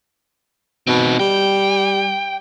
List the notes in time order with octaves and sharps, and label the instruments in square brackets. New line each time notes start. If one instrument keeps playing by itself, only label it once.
[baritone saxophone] B2 [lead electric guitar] C4 D#4
[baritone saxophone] G3 [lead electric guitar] G5